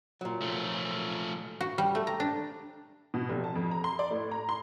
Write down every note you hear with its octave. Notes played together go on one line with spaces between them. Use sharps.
A#2 F#3
F3 A3
F#4
G3
A3
A#5
D4
B2
F1
A5
F2
A#5
C6
D5
A2
A#5
C6